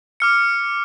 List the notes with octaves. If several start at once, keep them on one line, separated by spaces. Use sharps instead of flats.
D6 F6 C#7